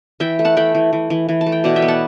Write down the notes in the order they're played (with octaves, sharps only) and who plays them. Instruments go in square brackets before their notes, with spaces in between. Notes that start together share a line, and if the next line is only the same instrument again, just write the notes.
[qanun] E3 E5 G5
A3
F#5 A5
A3 G5 B5
E3
E3
E3
E3
A5
A3
G5
B2 D5 F#5
E5 G5
B3
F#5 A5